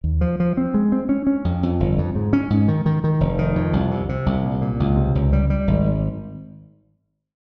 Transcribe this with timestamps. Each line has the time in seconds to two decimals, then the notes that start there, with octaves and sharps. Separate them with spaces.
0.04 D#2
0.21 F3
0.40 F3
0.57 C4
0.74 G#3
0.92 C4
1.09 C#4
1.27 C#4
1.45 F2
1.63 F2
1.80 G1
1.98 F2
2.15 G#2
2.33 C#4
2.50 G#2
2.68 D#3
2.86 D#3
3.04 D#3
3.20 F1
3.39 D#3
3.55 F2
3.73 C2
3.91 C3
4.09 C3
4.26 C2
4.44 A#2
4.61 A#2
4.80 C#2
4.96 C3
5.15 C#2
5.33 G3
5.50 G3
5.67 G#1